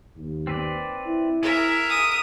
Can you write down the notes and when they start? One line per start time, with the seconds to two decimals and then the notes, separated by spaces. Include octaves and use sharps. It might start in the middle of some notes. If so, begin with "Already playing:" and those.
0.17 D#2
0.47 C4 B4 D5
1.07 E4
1.43 G#4 A#4 E5
1.89 D#6